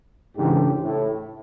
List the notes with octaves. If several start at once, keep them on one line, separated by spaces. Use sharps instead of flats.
G#2 C#3 E3 A3 D4 G4
A2